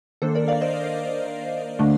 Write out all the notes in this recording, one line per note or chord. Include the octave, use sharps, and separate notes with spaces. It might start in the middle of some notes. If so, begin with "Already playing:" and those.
D#3 A#3 D4 A4 C5
A#4 D5
D5 F5
C5 D#5
D3 A3 D4